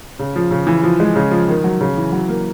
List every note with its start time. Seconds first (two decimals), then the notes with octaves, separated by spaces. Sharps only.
0.19 C#3
0.36 F3
0.51 C#3
0.67 E3
0.83 F3
1.00 G#3
1.16 C#3
1.31 F3
1.48 D#3
1.64 F#3
1.81 C#3
1.97 E3
2.12 F#3
2.29 A#3